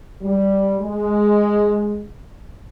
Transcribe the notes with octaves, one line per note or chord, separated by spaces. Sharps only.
G3
G#3